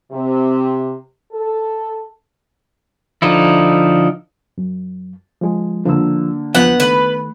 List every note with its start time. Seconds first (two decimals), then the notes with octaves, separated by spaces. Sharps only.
0.11 C3
1.32 A4
3.22 D3 F3 D#4 E4
4.58 F#2
5.41 F3 G#3
5.85 D3 F3 A#3 E6
6.55 E2 F3 B3 F#5 G6
6.80 D#3 A3 B4